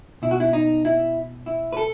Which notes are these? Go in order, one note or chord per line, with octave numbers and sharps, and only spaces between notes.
B2 E4
F#4
E4
D#4
E4
E4
B4
A4